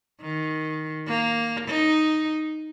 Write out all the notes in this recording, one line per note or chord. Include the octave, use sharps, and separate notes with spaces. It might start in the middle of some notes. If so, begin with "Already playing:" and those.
D#3
A#3
D#4